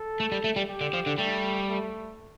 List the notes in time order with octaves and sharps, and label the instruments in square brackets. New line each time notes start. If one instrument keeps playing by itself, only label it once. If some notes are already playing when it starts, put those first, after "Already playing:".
Already playing: [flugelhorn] A4
[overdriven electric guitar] A3
G3
A3
G3
[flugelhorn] G4
[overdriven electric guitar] D3
F3
D3
[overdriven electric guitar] G3 [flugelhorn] A3
[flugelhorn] A3